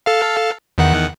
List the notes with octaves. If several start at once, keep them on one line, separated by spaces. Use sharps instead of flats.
A4 F5
E2 D#3 F#5